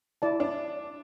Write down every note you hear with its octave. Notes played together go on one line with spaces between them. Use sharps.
E4 D5 A5
D4